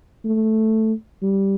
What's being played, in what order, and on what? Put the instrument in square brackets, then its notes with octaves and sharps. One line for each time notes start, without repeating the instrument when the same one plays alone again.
[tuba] A3
G3